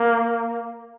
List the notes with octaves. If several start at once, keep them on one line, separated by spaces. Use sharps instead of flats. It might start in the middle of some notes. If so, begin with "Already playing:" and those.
Already playing: A#3